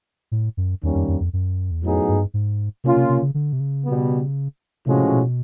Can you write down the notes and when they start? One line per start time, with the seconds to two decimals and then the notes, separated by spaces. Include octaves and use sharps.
0.32 A2
0.57 F#2
0.82 E2 D#3 G3 A#3 C#4
0.95 F2
1.08 F2
1.20 F2
1.33 F#2
1.71 E2
1.83 F2 A2 F#3 B3 D#4 G#4
2.09 G2
2.34 G#2
2.84 C3 A#3 C#4 F4
2.96 C3
3.09 C3
3.22 C#3
3.34 D3
3.53 C3
3.60 C#3
3.85 B2 G3 B3
4.86 A2 C3 F3 G#3 C#4 F#4
5.12 B2